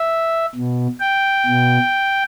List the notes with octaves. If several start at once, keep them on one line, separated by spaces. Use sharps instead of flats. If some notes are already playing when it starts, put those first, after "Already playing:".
Already playing: E5
B2
G5
B2